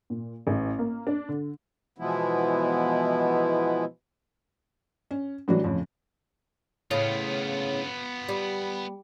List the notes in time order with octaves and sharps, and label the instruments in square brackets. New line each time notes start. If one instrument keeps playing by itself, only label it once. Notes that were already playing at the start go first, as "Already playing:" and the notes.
[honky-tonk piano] A#2
A1
A#3
D4
D3
[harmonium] B2 E3 F3 G#3 B3 E4
[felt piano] C#4
A2 E3 F#3 G3 D4 F#4
F2 A2 C#3 F3
[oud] A2 C#3 [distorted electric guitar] B3 F4
[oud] G3